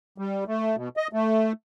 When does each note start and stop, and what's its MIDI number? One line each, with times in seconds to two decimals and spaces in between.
0.18 0.44 55
0.47 0.76 57
0.76 0.89 47
0.97 1.08 75
1.13 1.52 57